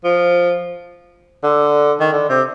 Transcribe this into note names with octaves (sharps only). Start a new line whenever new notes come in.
F3
D3
D#3
D3
C3